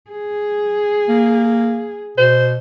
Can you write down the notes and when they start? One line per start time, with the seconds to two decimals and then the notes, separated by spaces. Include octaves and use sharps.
0.11 G#4
1.09 A#3
2.18 B2 C5